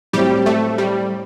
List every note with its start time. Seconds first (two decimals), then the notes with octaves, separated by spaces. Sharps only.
0.13 A2 F#3 G3 C4 E4 G4
0.46 A3
0.78 G3